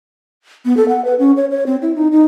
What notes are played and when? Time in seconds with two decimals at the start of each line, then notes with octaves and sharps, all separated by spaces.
0.65 B3
0.77 A4
0.89 F#5
1.05 B4
1.19 C#4
1.37 C#5
1.51 C#5
1.66 C4
1.82 E4
1.95 D#4
2.12 D#4